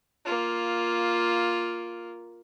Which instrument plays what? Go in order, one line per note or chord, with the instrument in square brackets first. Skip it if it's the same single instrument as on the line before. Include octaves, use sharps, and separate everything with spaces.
[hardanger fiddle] A#3 F4